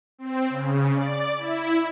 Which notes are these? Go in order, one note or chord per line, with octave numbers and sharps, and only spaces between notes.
C4
C#3
D5
E4